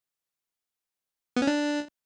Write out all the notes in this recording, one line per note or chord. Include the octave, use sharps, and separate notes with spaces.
B3
C#4
D4